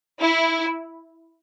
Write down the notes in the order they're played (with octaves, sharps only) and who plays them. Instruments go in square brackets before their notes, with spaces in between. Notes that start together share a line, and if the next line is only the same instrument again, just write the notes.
[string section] E4